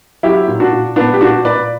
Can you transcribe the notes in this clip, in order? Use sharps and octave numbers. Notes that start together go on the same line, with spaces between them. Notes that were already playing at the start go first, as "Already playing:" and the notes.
F#3 E4 G4
A#2
D4 F#4
A#2
A#2 B3 D4
G4
A#2 D4 F#4
A#2 B4 D5